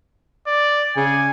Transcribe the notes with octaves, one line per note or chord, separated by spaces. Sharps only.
D5
C#3 G#5